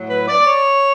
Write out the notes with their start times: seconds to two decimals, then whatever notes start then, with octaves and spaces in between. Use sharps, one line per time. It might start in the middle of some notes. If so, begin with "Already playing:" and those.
Already playing: A2 F#3
0.09 B4
0.28 D5
0.47 C#5